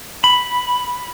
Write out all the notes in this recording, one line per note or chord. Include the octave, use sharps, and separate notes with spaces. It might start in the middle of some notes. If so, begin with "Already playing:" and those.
B5